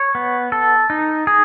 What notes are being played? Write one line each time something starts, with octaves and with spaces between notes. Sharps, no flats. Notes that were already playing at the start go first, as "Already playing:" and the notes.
Already playing: C#5
B3
A4
D#4
G#4